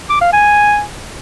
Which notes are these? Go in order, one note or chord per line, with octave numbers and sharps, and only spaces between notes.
D6
F5
G#5